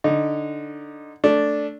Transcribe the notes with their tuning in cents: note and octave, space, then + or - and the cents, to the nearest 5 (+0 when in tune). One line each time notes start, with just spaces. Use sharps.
D3 +0 D#4 -10
A3 +0 D4 -5